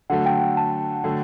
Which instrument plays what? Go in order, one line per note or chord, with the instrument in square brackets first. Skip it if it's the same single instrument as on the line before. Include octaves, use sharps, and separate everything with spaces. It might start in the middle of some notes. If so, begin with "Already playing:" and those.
[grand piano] D3 F#3 A3 [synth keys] F#5
[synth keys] G5
G5
A5
[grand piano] D3 F#3 A3